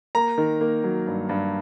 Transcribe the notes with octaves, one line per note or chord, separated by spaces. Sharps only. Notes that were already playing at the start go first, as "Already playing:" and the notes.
A#3 A#5
D#3
A#3
F#3
G2
G2